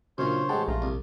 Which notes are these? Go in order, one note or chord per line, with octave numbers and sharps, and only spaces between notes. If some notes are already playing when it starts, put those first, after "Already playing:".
F#2 A#2 C#3 C#4 D4 C5 C#5
A1 G#3 F#5 G5 A5
A#1 F3 A3 F4 A#5
C2